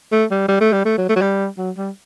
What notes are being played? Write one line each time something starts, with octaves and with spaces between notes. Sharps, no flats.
A3
G3
G3
A3
G3
A3
F#3
A3
F#3
G3
F#3
G3